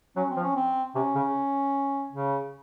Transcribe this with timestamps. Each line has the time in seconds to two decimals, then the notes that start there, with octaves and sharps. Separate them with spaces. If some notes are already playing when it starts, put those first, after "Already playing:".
0.17 F#3 C#4
0.30 C4
0.37 F3
0.43 C#4
0.56 C4
0.95 C3 C#4
1.15 C#3
2.13 C#3